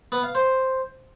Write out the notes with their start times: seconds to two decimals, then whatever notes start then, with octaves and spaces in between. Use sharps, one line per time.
0.12 B3
0.23 F5
0.35 C5